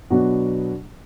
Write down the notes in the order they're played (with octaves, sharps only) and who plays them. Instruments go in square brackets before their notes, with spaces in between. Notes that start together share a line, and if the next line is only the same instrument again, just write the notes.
[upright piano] B2 F#3 B3 D4 F#4